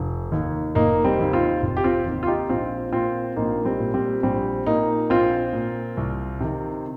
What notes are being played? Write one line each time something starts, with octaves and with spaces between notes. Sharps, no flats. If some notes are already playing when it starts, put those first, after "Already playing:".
Already playing: F1
D#2 D#3
F1 A#3 D#4
G3 C4
D#2 D#3
C4 F4
F1
G4
C4 F4
D#2 D#3
F4
D#4 G4
A#1 C4 F4
A#2 C4 F4
A#1 A#3 D#4
G3 C4
A#2
G3 C4
A#1 G3 C4
A#2 A#3 D#4
A#1 C4 F4
A#2
C2
C3 D#3